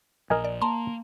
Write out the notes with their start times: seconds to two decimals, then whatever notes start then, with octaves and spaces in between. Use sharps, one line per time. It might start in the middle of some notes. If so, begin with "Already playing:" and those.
0.30 A#1 A#4 D#5 G#5
0.45 D5
0.62 A#3 A5 A#5 C6